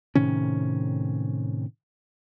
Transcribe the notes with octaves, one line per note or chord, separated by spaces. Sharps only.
A2 C3 D#3 C#4